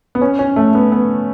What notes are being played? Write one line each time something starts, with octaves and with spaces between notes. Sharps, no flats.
B3
C#4
C#4
A3
B3
B3